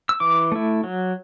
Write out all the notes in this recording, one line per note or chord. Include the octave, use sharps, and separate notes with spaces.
E6
E3 D6
A3 E4
F#3